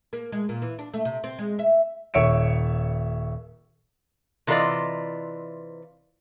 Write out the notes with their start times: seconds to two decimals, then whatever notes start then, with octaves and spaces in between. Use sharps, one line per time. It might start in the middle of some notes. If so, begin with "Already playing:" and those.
0.13 A#3
0.32 G#3
0.49 A#2
0.62 E3
0.79 D4
0.94 A3
1.05 C3
1.24 C4
1.39 G#3
1.59 E5
2.14 D#1 C#5 E5 C#7 D7
4.47 C3 E3 F4 A4 D5 D#5